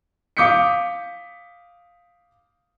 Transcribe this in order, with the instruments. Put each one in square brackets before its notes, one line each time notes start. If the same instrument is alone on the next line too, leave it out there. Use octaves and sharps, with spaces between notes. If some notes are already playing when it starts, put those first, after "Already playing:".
[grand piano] F5 D6 D#6 G6 B6 C#7